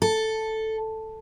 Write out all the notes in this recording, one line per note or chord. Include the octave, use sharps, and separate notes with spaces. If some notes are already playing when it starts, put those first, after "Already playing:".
A4